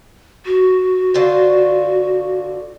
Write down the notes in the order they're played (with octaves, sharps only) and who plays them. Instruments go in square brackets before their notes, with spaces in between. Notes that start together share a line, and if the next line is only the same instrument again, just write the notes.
[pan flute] F#4
[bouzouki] D3 F4 C5